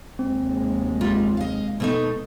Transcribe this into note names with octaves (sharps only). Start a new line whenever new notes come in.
F1 D#2 G#3 C4
G3 F4
D#5 F5
B2 A3 D#4